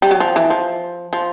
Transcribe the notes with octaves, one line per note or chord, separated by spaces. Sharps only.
G3
F#3
F3
E3
F3
F3